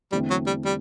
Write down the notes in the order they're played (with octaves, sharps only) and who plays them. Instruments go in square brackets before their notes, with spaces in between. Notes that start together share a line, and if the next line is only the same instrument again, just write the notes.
[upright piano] E2 D3 A3 C4 [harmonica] G3
[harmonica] F#3
G3
G3